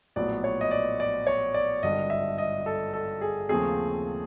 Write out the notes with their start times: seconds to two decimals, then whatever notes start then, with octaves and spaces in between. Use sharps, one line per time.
0.16 A#1 A2 F#3 B3 D5
0.44 C#5
0.61 D#5
0.71 D5
1.00 D5
1.27 C#5
1.54 D5
1.83 G#1 G2 D3 D#5
2.10 E5
2.38 D#5
2.66 A4
2.93 A4
3.21 G#4
3.49 D#2 C#3 F3 A3 C4 G#4